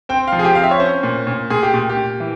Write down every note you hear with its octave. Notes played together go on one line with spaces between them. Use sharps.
C4 G5
F3 F5
G#4
G4
C4 F5
E5
C#5
C#4 C5
A#2
A#2
A#2 G#4
G4
A#2
G4
A#2
E3